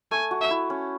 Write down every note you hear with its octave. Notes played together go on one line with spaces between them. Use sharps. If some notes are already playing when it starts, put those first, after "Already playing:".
A3 G#5
F#4
E5
E4
C#4